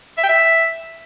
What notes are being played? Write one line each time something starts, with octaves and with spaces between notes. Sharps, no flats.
E5
G5
E5